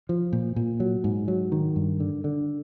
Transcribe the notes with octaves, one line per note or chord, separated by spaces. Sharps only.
F3
A#2
A#2
F#3
G#2
F#3
D#3
G2
D3
D3